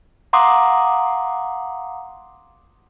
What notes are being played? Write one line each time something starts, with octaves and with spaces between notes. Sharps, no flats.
F5 F#5 A#5 C6 D6 D#6